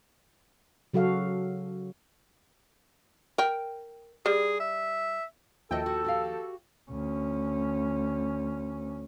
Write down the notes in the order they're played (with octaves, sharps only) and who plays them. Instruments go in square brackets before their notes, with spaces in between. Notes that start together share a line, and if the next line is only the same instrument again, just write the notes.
[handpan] C#3 F#3 F#4 A4 F5
[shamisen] A#4 G5
[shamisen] G3 [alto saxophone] G#4
[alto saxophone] E5
[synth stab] D#2 F3 G5 [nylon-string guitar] F#4 D#5 E5 [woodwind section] A4
[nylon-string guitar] F#4
F#4 G4 F5
[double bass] D2 C#4